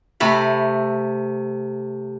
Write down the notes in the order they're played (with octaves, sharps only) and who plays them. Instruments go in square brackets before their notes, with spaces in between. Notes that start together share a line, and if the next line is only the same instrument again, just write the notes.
[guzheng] C3 A3 B5